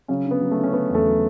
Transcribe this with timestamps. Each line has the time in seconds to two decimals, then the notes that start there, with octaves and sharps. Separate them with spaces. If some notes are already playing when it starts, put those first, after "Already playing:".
0.08 C#3 F#3 C#4
0.25 D3
0.31 B3
0.41 F#3
0.51 A3
0.57 D3
0.63 C#4
0.73 D3 B3
0.90 E2
0.95 A3 A4
1.06 F#3